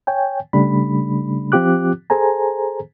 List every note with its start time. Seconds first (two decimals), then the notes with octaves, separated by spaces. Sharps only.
0.07 C#5 G5 G#5
0.53 C#3 G3 A3 D4 B5
1.52 F3 C4 F4 G4 D6 F#6
2.10 G#4 A4 C5 G#5 A#5